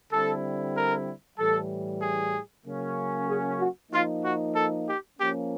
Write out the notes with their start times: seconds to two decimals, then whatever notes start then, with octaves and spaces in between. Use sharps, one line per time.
0.11 D3 G3 C4 E4 A4
0.75 A#4
1.38 A2 E3 G3 A4
2.02 G#4
2.65 C#3 F#3 A#3 C#4
3.29 G#4
3.60 F#4
3.92 F3 A#3 D#4 F4
4.24 F#4
4.56 A4
4.87 G4
5.19 F3 A#3 C#4 G4